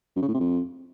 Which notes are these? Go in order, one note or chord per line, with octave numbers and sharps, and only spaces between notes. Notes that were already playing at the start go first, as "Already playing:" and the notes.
F#2
C#3
A2
C3
F2